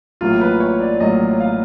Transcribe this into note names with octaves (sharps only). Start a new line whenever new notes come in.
A1 A2 F#3 A#3 F4
B4
C#5
D5
A1 A2 F#3 A#3 D#5
F5